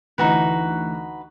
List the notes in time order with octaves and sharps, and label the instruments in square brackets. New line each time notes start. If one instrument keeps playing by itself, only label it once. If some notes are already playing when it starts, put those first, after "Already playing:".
[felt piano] D2 E3 [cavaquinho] D#4 F#4 B4